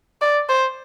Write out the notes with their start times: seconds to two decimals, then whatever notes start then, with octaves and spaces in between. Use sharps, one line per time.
0.21 D5
0.49 C5